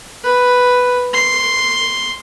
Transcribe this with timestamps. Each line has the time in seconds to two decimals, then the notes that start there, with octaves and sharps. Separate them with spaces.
0.24 B4
1.13 C6